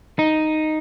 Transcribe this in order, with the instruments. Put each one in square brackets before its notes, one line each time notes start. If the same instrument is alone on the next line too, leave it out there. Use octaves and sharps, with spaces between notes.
[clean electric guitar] D#4